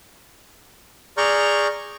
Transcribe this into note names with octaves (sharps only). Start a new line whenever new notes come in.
G#4 D5 A#5 C#6 F6 G6